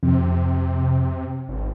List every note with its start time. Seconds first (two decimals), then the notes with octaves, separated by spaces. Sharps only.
0.03 F2 C3
1.49 G#1